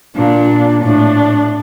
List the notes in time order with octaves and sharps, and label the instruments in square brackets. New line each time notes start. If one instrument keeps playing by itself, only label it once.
[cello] A#2 [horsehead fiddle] D4
[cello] A2 [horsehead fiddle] D4